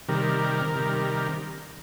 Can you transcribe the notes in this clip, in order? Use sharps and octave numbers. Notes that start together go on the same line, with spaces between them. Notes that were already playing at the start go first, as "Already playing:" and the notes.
C3 D#3 G3 A#4
C3 D#3 G3